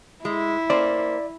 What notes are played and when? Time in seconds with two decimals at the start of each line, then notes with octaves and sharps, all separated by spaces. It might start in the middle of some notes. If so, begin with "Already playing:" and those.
0.25 G#3 E4
0.70 A#3 C#4 C5 D5